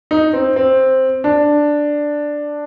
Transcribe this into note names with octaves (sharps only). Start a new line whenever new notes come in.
D#4
C4
C4
D4